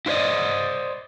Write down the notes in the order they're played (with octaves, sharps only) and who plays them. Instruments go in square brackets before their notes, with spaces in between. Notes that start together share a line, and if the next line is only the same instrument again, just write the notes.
[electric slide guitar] E4 F4 C5 D5 D#5